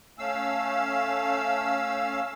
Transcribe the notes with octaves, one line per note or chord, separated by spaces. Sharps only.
A3 C#4 F5 E6